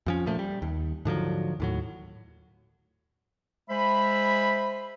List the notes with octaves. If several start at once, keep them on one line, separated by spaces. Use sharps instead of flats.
F2 F3 C#4
A#2 F3 A3
G3
D#2
G#2 D3 F3 F#3
D#2 A2 F#3
G#3 C5 E5 B5